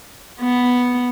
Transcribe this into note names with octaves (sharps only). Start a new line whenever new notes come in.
B3